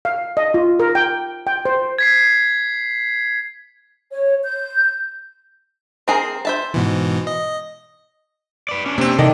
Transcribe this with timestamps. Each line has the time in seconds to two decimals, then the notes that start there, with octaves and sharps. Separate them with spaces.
0.05 F5
0.37 D#5
0.54 F4
0.80 A#4
0.95 G5
1.47 G5
1.65 C5
1.98 G#6 B6 C7
4.13 C#5
4.44 G6
6.08 C4 G#4 A#4
6.45 C5 E5 A5
6.74 G#2 B2 E3
7.27 D#5
8.69 B4 D5
8.86 C#4 D4
8.98 C3 A#3 C4
9.18 C3 D#3 E3 A4 D5 D#5